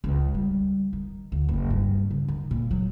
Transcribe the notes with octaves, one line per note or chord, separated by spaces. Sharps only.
C#2
G3
D#3
D2
F#1
G2
C#3
D#3
A#2
F#3